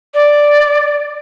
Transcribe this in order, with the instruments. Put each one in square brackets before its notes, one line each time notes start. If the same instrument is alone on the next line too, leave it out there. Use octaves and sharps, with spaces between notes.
[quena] D5